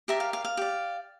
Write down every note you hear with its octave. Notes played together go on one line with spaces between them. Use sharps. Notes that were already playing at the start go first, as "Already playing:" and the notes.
G4 A#4 D5 E5
F5
F5
F5
G4 D5